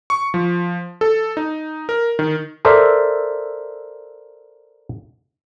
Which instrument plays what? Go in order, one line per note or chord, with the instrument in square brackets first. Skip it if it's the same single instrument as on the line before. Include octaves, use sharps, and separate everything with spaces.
[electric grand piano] C#6
F3
A4
D#4
A#4
D#3
[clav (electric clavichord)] A4 A#4 C5 D5 E5